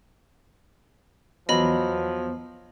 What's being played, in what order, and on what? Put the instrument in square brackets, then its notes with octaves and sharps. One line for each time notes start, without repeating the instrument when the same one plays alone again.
[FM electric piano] E2 B3 [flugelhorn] F3 [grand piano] F#3 [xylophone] D#5 B5